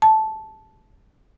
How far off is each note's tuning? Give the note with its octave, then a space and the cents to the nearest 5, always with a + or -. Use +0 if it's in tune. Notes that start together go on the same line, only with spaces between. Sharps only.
A5 -10